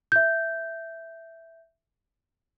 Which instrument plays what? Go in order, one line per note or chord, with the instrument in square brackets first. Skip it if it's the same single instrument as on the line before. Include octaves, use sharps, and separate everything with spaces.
[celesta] E5 G6